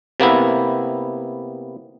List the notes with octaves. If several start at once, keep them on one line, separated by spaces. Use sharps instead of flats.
C3 A#3 B3 E4